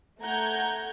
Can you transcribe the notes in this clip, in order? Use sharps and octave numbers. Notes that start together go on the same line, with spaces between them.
A3 F#5 A#5 G6 G#6